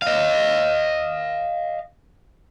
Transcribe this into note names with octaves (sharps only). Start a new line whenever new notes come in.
D#5 F5